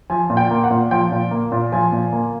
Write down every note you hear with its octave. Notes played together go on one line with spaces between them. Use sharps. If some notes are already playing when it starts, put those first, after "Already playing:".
F3 G#5
A#2
G5
A#3
F#5
A#2
F3 G5
A#2
A#3
A#2
F3 G#5
A#2
A#3